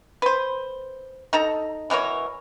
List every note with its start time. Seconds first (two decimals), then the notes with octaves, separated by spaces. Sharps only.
0.22 B4 C5
1.33 D#4 A4 A#5
1.90 B2 E3 A#4 C#5